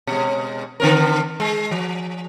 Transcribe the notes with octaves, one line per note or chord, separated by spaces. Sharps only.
B2 G#3
D3 C4 A#4
G#3
F3